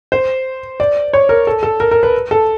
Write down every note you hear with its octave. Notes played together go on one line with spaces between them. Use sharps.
C5
D5
C#5
A#4
A4
A4
A#4
A#4
B4
A4